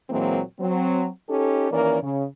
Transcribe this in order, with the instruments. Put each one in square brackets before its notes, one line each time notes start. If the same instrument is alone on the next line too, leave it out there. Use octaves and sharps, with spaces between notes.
[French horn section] A#2 E3 F#3 G#3 A#3 C4
F#3 C4
C#4 D#4 G4 A4
D#2 E3 A#3 C#4 A#4 D5
C#3